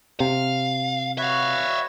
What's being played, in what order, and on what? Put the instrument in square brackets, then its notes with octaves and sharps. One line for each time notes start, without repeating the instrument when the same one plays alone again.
[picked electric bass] C3 [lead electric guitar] F5
[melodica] F#4 B4 C#5 [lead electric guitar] E5 F5